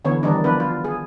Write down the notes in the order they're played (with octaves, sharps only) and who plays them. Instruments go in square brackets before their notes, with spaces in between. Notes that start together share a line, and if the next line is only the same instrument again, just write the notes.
[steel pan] D3 E3 B3 C#5
D#3 E3 G3 D4 D#4
F3 B3 D4 B4
F4
G#4